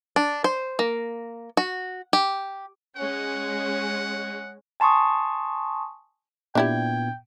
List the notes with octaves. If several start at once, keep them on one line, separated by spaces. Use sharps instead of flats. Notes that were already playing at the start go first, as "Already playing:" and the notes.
D4
C5
A#3
F#4
G4
G#3 C#4 F#5
G#5 A5 C6 C#6 D#6
A#2 B3 D4 E4 G4 G5 G#6